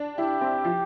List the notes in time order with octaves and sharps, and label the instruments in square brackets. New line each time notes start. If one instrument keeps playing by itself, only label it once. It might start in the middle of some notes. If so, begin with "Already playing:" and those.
Already playing: [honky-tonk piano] D4
[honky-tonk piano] E4 [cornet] G4
[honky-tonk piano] C4
F3